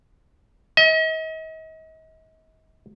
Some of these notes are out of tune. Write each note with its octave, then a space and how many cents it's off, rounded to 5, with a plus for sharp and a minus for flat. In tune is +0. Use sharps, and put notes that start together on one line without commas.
D#5 +40